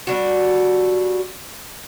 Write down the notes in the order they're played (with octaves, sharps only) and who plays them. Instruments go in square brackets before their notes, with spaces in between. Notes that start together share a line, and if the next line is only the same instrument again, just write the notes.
[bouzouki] G3 D4 F#4